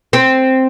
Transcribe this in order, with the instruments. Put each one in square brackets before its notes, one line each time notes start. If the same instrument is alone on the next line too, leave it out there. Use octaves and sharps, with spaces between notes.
[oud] C4